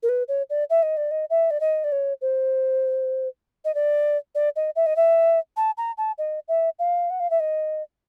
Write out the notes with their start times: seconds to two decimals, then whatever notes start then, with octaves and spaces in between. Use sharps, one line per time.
0.03 A#4
0.09 B4
0.28 C#5
0.50 D5
0.70 E5
0.83 D#5
0.97 D5
1.11 D#5
1.30 E5
1.51 D5
1.60 D#5
1.84 D5
1.92 C#5
2.21 C5
3.65 D#5
3.75 D5
4.35 D5
4.56 D#5
4.76 E5
4.86 D#5
4.96 E5
5.57 A5
5.78 A#5
5.98 A5
6.18 D#5
6.48 E5
6.79 F5
7.10 F#5
7.20 F5
7.30 E5
7.40 D#5